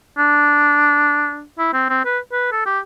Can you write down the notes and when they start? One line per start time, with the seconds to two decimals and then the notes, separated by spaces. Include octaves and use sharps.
0.18 D4
1.59 E4
1.74 C4
1.89 C4
2.05 B4
2.32 B4
2.52 A4
2.66 G4